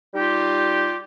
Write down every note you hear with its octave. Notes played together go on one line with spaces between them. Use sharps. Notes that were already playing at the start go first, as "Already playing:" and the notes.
G3 D#4 F4 G4